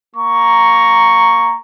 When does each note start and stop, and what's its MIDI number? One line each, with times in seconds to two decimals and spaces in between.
0.16 1.56 58
0.16 1.56 82
0.16 1.56 85